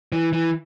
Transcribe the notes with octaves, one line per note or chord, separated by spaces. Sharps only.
E3
E3